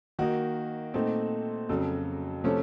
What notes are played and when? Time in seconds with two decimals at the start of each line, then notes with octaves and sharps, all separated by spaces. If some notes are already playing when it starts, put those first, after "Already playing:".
0.19 D#3 A#3 D#4 F#4
0.94 A#2 A3 C4 D#4
1.69 F2 C#3 F#3 A4
2.44 C3 F3 A3 C#4